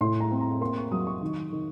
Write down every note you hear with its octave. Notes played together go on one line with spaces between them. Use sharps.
A2 C6
A#5
C4
A#5
A#3 C6
C#6
F#3 D#6
C#6
D#3
D#3